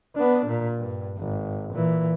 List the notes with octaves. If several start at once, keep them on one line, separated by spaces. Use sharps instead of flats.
B3 D4
A#2
G2
G#1
A#2 E3